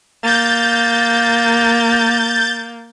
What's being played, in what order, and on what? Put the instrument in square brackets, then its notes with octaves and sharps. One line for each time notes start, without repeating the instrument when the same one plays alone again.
[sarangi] A#3 [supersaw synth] G6 A6